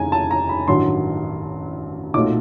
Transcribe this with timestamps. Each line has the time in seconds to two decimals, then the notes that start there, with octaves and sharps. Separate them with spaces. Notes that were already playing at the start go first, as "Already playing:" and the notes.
Already playing: F1 D#2 C#3 G#3 G#5 A#5
0.12 A5
0.31 A#5
0.49 B5
0.68 A1 G2 D#3 F#3 C6
2.14 B1 A#2 F#3 A3 D6